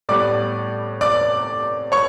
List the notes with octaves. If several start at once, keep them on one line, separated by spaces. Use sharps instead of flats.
A2 G3 B3 D5 D6
D5 D6
C#5 C#6